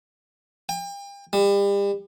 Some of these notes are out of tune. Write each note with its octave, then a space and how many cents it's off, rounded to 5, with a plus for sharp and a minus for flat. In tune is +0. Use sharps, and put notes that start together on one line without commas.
G5 +40
G3 +35